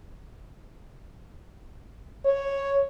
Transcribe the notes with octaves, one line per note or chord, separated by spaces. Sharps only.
C#5